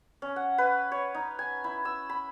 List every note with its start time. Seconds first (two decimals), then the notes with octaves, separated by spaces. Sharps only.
0.22 C#4
0.36 F#5
0.58 B4
0.92 C#5
1.15 D#4
1.39 G#5
1.64 E4
1.85 E6
2.10 B5